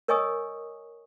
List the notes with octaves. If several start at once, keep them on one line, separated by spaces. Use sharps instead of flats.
A#4 C#5 D#5 G#5 C#6 D#6